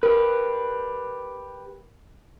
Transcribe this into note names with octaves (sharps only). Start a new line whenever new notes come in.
G4 A#4 B4